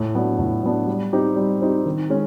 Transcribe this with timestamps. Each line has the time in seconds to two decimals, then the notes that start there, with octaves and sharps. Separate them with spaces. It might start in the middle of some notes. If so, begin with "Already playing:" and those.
Already playing: A2
0.14 F#3 B3 D4
0.39 A2
0.63 F#3 B3 D4
0.87 G3
1.13 C4 D#4 G4
1.36 G3
1.61 C4 D#4 G4
1.85 D#3
2.10 G#3 C#4